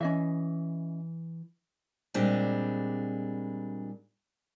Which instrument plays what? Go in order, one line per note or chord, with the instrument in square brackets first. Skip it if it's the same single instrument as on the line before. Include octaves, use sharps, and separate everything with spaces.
[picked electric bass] E3 [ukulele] C#4 D#5 E5
[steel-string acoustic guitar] A#2 G3 G#3 C4 D4